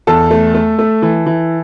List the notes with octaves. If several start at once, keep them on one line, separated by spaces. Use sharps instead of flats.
E2 A4 A5
A3
A3
A3
E3
E3